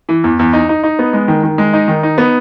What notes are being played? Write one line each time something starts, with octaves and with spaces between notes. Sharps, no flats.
E3
E2
E2
D#4
D#4
D#4
B3
G#3
D#3
D#3
G#3
D#4
D#3
D#4
B3